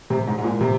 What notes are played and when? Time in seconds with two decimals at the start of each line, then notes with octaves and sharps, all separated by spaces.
0.10 C3
0.27 G#2
0.38 G#2
0.44 A#2
0.61 C3